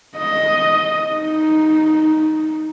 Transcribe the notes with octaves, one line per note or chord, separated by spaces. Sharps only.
D#5
D#4